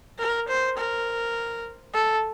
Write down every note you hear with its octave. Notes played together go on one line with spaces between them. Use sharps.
A#4
C5
A#4
A4